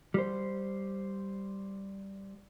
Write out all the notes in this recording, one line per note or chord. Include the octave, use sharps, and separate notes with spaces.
G3 C5